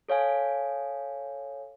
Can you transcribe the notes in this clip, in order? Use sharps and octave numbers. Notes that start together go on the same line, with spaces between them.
A4 C#5 F5 G#5